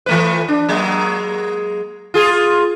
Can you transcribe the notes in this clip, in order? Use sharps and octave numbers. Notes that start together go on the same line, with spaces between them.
E3 A3 B4
D4
F#3 G#3 A#3
F4 G#4